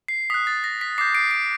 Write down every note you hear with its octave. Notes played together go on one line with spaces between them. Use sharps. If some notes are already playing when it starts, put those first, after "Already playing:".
C7
D#6 F#6 B6
A6
A#6
B6
D6 G6 C7
C7 D7
C7 D7